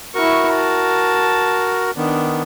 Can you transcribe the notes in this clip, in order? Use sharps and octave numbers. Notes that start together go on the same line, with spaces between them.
E4 F#4 A#4 C#6
A5
D#3 B3 D4